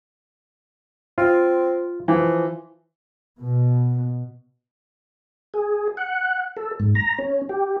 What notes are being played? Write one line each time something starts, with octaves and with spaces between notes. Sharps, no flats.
C4 F4
E3 F3
B2
G#4
F#5
A4
G#2
A#5
C#4
G4